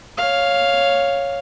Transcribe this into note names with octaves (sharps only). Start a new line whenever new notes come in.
C#5 F5